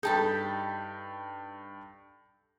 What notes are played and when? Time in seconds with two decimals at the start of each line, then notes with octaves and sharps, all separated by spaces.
0.03 G2 D#4 G4 A4 G5 A5 B5 G6